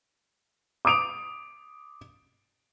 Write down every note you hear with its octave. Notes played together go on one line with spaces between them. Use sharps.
D6 D#6 D7 F7